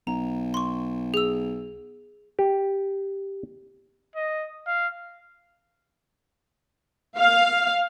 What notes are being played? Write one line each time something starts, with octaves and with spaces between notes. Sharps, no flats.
B1 A#5
C6 C#6
G#4 E6
G4
D#5
F5
F5